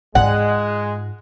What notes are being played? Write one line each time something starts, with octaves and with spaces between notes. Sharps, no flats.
G#2 G#3 F4 F#5